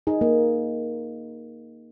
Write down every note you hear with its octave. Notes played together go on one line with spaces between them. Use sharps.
D#4 G#4
A#3